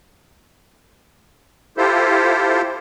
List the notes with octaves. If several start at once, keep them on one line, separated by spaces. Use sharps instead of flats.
E4 F4 G4 A4 C5